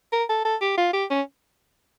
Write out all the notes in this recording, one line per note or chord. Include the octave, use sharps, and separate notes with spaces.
A#4
A4
A4
G4
F4
G4
C#4